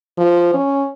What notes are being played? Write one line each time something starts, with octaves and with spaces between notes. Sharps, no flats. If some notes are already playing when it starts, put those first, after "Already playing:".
F3
C#4